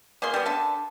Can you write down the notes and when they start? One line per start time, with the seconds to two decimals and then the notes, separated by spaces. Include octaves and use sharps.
0.22 B2 A#3 G#4 C6
0.34 G3 B3
0.46 D3 E5 A5